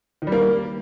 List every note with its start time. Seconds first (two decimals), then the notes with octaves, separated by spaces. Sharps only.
0.22 D#3
0.27 G3
0.32 A#3